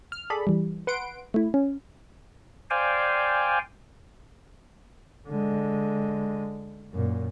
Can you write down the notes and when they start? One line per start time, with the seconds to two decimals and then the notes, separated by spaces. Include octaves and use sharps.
0.12 F6
0.30 G#4 A4 D5 B5
0.47 E3 G3
0.87 B4 F#5 C6 D7
1.34 A3 E4
1.54 C#4
2.70 C5 D5 F5 G5 G#5
5.29 D3 G#3
6.92 F#2 A#2